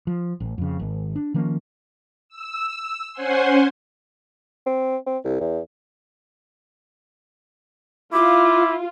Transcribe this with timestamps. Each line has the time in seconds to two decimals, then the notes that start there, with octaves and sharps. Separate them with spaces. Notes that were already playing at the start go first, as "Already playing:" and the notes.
0.07 F3
0.40 A1
0.58 F2 C#3
0.79 G#1
1.16 D4
1.34 D#3 F3 A#3 C#4
2.29 E6
3.13 C#4 C5 F#5 G#5 C6
4.66 C4
5.07 C4
5.25 C2
5.40 E2
8.13 E4 F4 D6